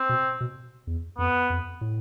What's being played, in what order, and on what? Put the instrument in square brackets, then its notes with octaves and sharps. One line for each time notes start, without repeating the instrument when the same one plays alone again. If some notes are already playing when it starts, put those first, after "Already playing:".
Already playing: [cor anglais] C4
[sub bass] B2
B2
E2
[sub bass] F2 [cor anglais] B3
[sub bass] F2
A2